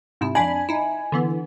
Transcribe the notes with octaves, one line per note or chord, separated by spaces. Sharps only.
G#2 C3 E4
F2 D4 G#5 B5
D#4 E4
D3 E3 B3